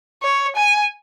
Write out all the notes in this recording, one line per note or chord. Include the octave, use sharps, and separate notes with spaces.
C#5
G#5